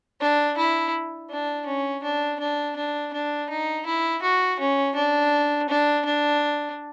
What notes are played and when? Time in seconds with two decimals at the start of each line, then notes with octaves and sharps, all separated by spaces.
0.21 D4
0.58 E4
1.30 D4
1.66 C#4
2.03 D4
2.40 D4
2.77 D4
3.14 D4
3.50 D#4
3.86 E4
4.23 F#4
4.60 C#4
4.96 D4
5.69 D4
6.05 D4